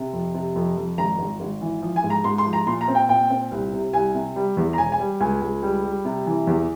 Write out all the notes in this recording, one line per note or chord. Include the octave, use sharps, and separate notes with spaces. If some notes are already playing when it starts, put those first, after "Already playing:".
Already playing: C3
F2
C3
F2
F2
G#1 A#5
G#1
G#1
E3
F3
G#5
G#2
A#5
G#2 C6
C6
F3
A#5
A#2 C6
A#5
C4
G5
A#2 G5
C4
C2
C3
C2 G#5
C3
G3
E2
A#5
E1 G#5
G#5
G3
C#2 G#5
C#2
G3
G3
C3
E3
E2